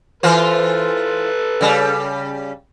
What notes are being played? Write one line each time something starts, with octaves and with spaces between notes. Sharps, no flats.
E3 F4 A4 B4 C5
C#3 G3